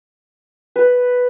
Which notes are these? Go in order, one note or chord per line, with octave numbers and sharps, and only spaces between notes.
B4